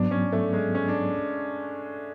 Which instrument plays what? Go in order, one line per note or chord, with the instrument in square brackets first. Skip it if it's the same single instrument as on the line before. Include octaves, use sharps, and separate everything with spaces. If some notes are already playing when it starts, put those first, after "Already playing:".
Already playing: [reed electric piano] G#2 F#3 B3 [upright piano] D4
[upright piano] C#4
A3
G#3
C#4
D4